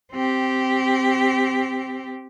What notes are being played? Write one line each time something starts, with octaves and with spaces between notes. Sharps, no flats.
C4 G4